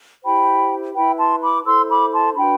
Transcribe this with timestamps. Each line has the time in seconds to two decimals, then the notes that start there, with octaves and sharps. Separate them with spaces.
0.23 E4 G4 C5 G5 B5
0.94 E4 B4 G5 B5
1.18 A5 C6
1.41 B5 D6
1.65 E4 A4 C5 C6 E6
1.89 B5 D6
2.12 A5 C6
2.36 D4 F#4 B4 G5 B5